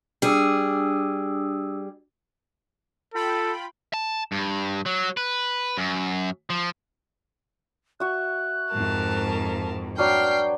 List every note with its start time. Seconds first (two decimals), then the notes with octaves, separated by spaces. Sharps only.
0.22 G3 D4 G#4 D#6 E6
3.14 F4 A4 G5 B5
3.94 A5
4.32 G2
4.86 F#3
5.17 B4
5.77 F#2
6.50 F3
8.00 F#4 E5 F#6
8.73 F2 G#2 A#4 A5
9.98 F#3 D4 B4 G5 F6 C7